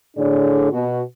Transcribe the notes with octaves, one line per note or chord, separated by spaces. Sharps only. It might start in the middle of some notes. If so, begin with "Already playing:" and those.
A2 D3 D4 G#4 C#5 D5
B2 F#4